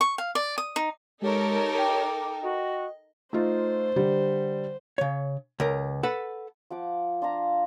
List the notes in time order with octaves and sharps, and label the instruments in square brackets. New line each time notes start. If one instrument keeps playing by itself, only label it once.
[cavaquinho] C#6
F5
D5
D#6
D#4
[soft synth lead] G#3 [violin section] D#4 A4 A#4 [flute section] G4 C#5
[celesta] G5 [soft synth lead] D6
[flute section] F#4 [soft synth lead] D#5
[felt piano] A3 D#4 F4 [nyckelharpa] C5
[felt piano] D3 G3
[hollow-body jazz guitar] C#3 C#5
C#2 A#4
A4 B4 F#5
[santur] F3 F#5 D6
D4 F4 F5 A#5